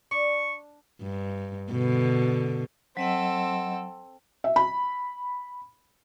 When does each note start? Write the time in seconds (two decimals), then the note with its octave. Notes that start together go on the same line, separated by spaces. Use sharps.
0.11 D4 C#6
1.02 G2
1.72 B2 D3
2.97 F#3 C4 A4 D#5 F#5
4.44 E5
4.56 B5